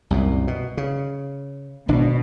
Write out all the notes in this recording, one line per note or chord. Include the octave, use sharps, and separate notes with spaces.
C2 F#2 A#2
B2
C#3
G#1 B2 D4